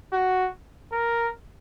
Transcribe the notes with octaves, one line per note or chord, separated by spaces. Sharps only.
F#4
A#4